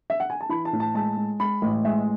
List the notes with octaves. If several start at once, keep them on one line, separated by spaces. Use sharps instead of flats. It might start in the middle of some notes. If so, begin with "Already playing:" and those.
E5
F#5
G#5
A5
E3 B5
A5
A2
A5
G#3 A5
G#3
G#3 B5
A1
G#3 E5